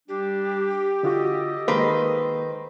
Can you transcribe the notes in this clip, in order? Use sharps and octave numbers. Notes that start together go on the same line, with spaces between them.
G3 D4 G4
D3 F4 F#4 A4 D#5
D#3 G#3 A#3 B4 C5